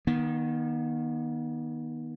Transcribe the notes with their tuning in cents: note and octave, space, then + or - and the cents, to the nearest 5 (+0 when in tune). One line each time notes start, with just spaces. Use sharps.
D#3 +0 B3 -40